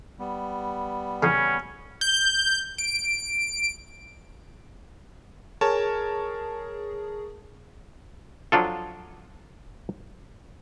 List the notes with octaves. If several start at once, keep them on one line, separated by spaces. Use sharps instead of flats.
G3 B3
E2 C#3 C#4
G6
D7
G#4 A#4 C#5 A5
F3 F#3 D4 F4 A4